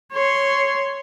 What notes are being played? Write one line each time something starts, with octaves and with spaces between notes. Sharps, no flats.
C#5 C6